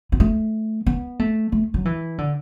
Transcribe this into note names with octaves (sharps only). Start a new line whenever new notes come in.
B3
A3
B3
A3
A3
F#3
E3
D3